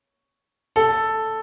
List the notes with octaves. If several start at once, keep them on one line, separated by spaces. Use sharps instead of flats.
A4